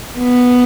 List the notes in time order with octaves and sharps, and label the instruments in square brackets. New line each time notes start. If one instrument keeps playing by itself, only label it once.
[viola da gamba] B3